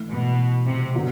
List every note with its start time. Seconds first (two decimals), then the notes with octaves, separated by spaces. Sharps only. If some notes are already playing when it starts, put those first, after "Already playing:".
Already playing: A2 E3 A3 E4
0.10 B2
0.66 C3
0.94 D3 F#3 B3